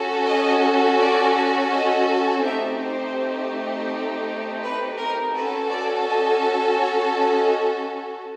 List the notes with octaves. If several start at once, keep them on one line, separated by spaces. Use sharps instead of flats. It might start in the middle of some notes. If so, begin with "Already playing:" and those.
Already playing: C#4 F#4 A4
D#5
D5
D#5
A3 C4 D#4 G4 E5
C5
B4
A#4
C#4 F#4 A4 B4
D5
D#5
C#5
D#5